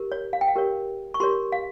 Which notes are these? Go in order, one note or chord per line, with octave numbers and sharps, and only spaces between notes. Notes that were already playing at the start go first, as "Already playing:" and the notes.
Already playing: G4 A#4
C#5
F5
G5
F5
G4 A#4 C#5
C#6
G4 A#4 C#5 C6
F5